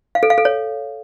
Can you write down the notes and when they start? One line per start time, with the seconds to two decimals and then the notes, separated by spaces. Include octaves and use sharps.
0.15 F5
0.23 A4
0.30 F5
0.38 A4
0.45 C#5